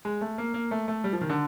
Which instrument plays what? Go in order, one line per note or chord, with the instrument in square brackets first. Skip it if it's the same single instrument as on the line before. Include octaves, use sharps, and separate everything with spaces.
[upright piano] G#3
A3
A#3
A#3
A3
A3
G3
F3
D#3
D3